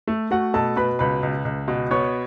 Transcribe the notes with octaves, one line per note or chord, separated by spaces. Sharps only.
A3
A3 F#4 F#5
B2 A4 A5
B2 B4 B5
C#2 B4 B5
C#2
C#2
B2
B3 C#5 C#6